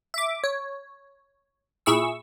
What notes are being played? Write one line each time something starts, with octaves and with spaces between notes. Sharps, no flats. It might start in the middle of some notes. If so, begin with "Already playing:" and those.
E5 D6
C#5
A#2 E4 G#4 C#6 E6